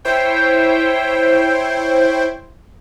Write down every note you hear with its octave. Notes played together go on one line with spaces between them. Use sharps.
E4 C5 C#5 G5